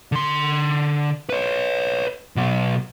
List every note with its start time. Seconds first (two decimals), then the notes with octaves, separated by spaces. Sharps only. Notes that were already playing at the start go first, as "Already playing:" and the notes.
0.12 D3 C6
1.30 B4 C#5
2.36 B2 F#3